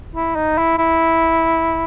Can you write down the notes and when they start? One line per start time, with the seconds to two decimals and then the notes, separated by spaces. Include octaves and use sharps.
0.15 E4
0.36 D#4
0.58 E4
0.78 E4